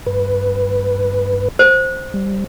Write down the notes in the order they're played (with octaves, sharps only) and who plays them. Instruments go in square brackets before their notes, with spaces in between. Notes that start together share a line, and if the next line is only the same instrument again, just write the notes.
[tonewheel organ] G2 B4
[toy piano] C5
[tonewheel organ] G3